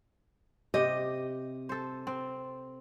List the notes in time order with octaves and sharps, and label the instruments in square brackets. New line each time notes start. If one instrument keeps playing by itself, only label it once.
[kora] C3 G4 [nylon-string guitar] D#5
[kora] A4 C5
C4